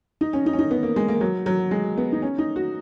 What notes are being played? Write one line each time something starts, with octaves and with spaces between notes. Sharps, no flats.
D#4
C#4
D#4
C#4
D#4
B3
A#3
G#3
A#3
F#3
F#3
G#3
B3
D#4
C#4
D#4
F#4